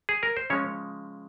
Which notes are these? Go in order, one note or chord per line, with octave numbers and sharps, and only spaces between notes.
G#4
A#4
C5
C#3 F3 G#3 C#4 C#5